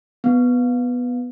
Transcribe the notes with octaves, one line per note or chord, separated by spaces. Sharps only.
B3